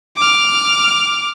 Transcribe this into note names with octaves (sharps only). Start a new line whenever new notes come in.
D6 F6